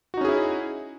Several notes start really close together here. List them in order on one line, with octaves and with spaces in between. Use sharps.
F#4 D#4 C#4 G#4 E4